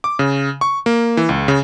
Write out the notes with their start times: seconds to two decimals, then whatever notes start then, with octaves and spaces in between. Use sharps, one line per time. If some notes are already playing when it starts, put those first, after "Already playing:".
0.04 D6
0.19 C#3
0.61 C#6
0.86 A#3
1.17 E3
1.29 C#2
1.48 C#3